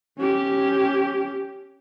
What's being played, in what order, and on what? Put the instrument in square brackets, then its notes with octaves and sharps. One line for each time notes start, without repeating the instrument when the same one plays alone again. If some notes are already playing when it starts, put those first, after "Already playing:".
[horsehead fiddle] C#4 G4